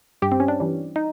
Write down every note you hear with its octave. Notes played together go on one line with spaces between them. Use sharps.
G2 G4
C4
C#4
D4
E3 G3
D#4